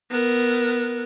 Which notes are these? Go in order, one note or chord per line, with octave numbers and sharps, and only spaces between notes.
B3 A#4